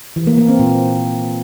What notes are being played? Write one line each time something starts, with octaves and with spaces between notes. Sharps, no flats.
E3
A#3
A#3
C4
A#2